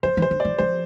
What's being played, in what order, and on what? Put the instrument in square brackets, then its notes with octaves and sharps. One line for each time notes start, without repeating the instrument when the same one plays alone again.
[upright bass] F3 [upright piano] C5
[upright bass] E3
[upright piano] C5
[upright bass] D3
[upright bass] E3 [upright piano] D5
[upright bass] F3 [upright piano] C5